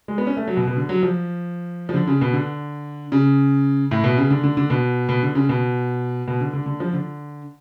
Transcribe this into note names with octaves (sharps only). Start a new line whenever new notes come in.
G#3
B3
C#4
A3
F#3
B2
B2
D3
F#3
F3
F3
D3
C#3
B2
D3
C#3
A2
B2
C#3
D3
D3
D3
B2
B2
D3
C#3
B2
B2
D3
D3
D3
F3
D3